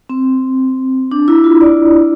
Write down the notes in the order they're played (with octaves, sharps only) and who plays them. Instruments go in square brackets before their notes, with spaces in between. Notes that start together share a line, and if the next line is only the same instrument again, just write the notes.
[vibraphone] C4
D4
E4
F4
D5